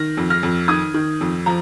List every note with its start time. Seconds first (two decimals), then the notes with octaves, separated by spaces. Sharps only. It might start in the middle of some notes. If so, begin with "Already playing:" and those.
Already playing: D#3 F6 A#6
0.17 F2
0.30 F6 A#6
0.43 F2
0.68 D#3 D#6 G#6
0.94 D#3
1.21 F2
1.46 F3 A#5